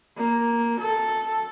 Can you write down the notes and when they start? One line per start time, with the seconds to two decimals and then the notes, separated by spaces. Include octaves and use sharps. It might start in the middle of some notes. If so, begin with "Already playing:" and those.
0.17 A#3
0.80 A4